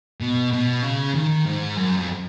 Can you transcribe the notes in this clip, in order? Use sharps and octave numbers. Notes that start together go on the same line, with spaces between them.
B2
B2
C#3
D#3
G#2
F#2
F2